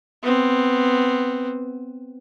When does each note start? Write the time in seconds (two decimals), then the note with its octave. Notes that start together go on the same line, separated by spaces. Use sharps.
0.22 B3 C4